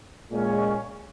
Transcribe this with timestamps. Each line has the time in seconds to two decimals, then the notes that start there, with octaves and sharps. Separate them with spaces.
0.32 A#2 G#3 C#4